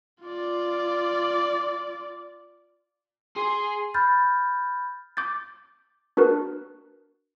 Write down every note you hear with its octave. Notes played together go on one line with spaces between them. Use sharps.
F4 D5
G#4 C6
B5 F6 G6 A6
D6 G6 A6
D4 F#4 A#4 B4